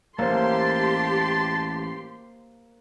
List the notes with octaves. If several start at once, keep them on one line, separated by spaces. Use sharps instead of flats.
A1 A#3 G4 C5 A5 C6